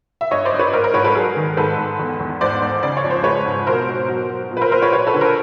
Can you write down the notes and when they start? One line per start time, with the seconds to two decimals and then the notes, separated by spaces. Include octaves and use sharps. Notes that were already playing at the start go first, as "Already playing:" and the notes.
0.21 E5
0.31 G2 C#5 D#5
0.45 C5 D5
0.52 G2
0.59 B4 C#5
0.73 G#2 A#4 C5
0.84 A#4 C5
0.94 G#2 B4 C#5
1.04 A4 B4
1.15 F#3 G#4 A#4
1.36 D#3
1.57 G#2 A4 B4
1.78 G#2
1.99 E2
2.20 E2
2.41 G#2 C5 D5
2.62 G#2
2.83 C#3 D5
2.97 C#5
3.04 F2
3.10 C5
3.24 G#3 B4 C#5
3.46 G#2
3.67 B2 A#4 C5
3.88 B2
4.09 F#3
4.30 F#3
4.51 A#2
4.57 B4
4.61 A#4 C5
4.72 A#2 A#4 C5
4.82 B4 C#5
4.92 F#3 B4 C#5
5.07 A4 B4
5.14 D3
5.21 A#4 C5